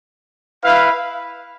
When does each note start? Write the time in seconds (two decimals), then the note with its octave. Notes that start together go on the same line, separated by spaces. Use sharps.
0.64 E4 B4 F5